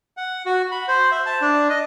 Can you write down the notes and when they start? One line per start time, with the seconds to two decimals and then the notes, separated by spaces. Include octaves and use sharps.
0.17 F#5
0.46 F#4
0.72 B5
0.88 C5
1.11 E5
1.26 A5
1.42 D4
1.70 D#5